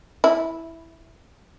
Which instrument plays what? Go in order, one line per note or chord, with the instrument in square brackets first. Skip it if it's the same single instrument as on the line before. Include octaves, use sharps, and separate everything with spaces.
[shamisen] E4